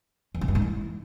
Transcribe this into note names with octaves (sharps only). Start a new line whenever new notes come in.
E2
C3
G2
G#2
E3